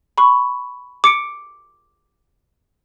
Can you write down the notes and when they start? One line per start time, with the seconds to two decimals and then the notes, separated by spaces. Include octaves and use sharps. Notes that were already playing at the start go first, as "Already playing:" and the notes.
0.18 B5 C#6
1.04 D6 C#7 D7